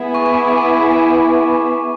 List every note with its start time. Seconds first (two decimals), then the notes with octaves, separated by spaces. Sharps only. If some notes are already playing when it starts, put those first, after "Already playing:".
Already playing: B3 E4 G#4
0.15 C#6
0.26 C#6
0.34 D6